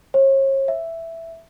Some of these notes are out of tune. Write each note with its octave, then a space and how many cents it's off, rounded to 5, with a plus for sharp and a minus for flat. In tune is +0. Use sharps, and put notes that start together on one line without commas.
C#5 -40
E5 +5